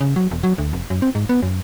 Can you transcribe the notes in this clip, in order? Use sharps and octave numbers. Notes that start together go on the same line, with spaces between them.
C#3
F#3
E1
F#3
D2
F1
F#2
C4
G#2
B3
F#2